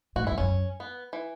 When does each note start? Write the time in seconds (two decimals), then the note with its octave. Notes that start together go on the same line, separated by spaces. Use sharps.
0.16 A2 F#4
0.24 G2
0.27 E4
0.31 E2
0.38 F#2 C#4
0.80 B3
1.13 E3